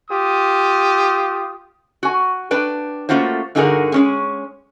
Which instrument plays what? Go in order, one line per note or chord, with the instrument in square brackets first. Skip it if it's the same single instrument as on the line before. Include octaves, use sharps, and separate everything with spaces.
[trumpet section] F4 G4 D#6
[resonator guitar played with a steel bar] F#4 G#5
D4 B4 G5
A3 A#3 C#4 F4 F#4 C5
G2 D3 D#4 F#4 G#4 A#4
G#3 C#4 G#4